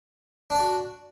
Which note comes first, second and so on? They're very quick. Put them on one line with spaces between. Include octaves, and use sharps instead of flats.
D4 D5 F#4